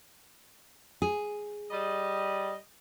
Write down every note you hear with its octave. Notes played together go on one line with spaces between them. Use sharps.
G#4
G3 D#5